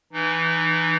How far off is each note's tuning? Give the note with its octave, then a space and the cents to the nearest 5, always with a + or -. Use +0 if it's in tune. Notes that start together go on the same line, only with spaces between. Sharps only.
E3 +0 D#4 -25